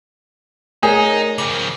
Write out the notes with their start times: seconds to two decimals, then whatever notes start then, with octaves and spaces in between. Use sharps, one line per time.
0.83 A3 D#4 G#4 A#4 C#5
1.38 C#3 F3 D6